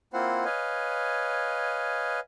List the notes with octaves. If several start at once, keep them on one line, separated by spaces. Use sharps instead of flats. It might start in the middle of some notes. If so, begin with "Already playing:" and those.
A#3 C4 E4 F4 C5 F#5
B4 C#5 D#5 F5 G#5